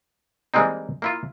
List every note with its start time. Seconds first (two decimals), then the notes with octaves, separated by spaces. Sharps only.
0.54 E3 G3 G#3 A#3 C4 D#4
1.02 A#3 E4 F4